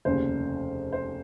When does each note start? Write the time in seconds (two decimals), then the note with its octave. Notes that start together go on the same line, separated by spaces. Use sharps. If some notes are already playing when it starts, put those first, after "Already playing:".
0.05 F1 D#2 C#3 C5
0.93 C5